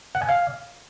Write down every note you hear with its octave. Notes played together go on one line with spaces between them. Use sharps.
F#5
G#5
F5